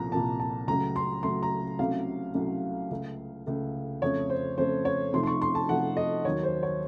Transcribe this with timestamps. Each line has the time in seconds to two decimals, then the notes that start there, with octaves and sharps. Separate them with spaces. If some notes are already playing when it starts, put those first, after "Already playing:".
Already playing: C2 A#2 F3 A#3 A#5
0.12 C2 A#2 F3 A#3 A5
0.40 A5
0.67 C#2 C#3 F#3 A3 A#5
0.96 C6
1.23 C#2 C#3 F#3 A3 C6
1.43 A#5
1.79 C2 C3 F#3 A3 C#4 F5
2.34 C2 C3 F#3 A3 C#4
2.91 C#2 C#3 A3
3.47 C#2 C#3 A3
4.02 F2 C#3 A3 C#5
4.30 C5
4.58 F2 C#3 A3 C5
4.85 C#5
5.13 C3 F3 A3 D#4 C6
5.23 C6
5.27 C#6
5.42 C6
5.55 A5
5.69 C3 F3 A3 D#4 F#5
5.97 D#5
6.24 D#2 D#3 F#3 C#5
6.43 C5
6.63 C#5